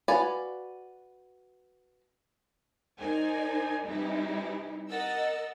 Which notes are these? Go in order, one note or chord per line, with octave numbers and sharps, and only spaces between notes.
F#4 B4 D5 F5 G#5
D#4 A#4 C5 D5 G#5
C3 E3 G3 D#4 E4
A#4 D#5 F#5 E6 A6